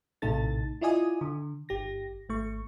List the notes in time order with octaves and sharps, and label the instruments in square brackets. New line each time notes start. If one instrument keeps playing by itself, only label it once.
[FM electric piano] A#1 A2 C3 D#4 A4 A6
E4 F4 D5 D#5 G#5 D#6
D3
G1 G4 A#6
G#1 A3 C#6